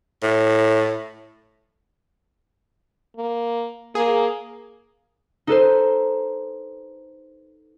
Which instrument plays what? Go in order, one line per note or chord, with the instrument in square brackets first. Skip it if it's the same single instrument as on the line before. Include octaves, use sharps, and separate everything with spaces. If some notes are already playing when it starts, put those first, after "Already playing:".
[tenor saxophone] A2
[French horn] A#3
[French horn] A#3 [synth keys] G#4
[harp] D#4 A4 B4 C5